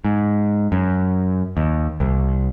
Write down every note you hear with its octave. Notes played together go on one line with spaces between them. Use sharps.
G#2
F#2
D#2
C2